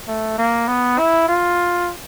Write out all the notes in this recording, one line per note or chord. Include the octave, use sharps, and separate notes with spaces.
A3
A#3
B3
E4
F4